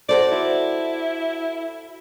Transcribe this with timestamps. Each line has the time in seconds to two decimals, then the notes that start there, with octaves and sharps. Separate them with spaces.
0.09 F#4 A4 C5 D5
0.32 E4